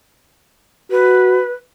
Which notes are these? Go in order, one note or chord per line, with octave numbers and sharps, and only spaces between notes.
F#4 B4